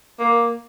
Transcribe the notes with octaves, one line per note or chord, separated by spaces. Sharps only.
A#3